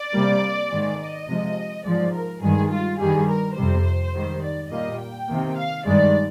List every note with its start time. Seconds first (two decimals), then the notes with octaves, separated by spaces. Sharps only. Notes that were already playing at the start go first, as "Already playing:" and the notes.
Already playing: D5
0.13 C3 G3 A#3
0.70 G#2 D#3 G#3
0.99 D#5
1.27 C3 F3 G#3
1.84 G#2 F3 G#3 D5
2.13 A#4
2.42 G2 D#3 G#3 G#4
2.70 F4
2.99 G2 D#3 G3 G#4
3.28 A#4
3.56 F2 C3 G3 C5
4.13 G#2 D#3 G3
4.42 D5
4.70 A#2 G3 A#3 D#5
4.99 G5
5.28 C3 D#3 A#3
5.57 F5
5.85 G2 D#3 G#3 D5